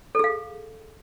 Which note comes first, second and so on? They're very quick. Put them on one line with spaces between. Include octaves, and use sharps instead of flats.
A4 G#4 F5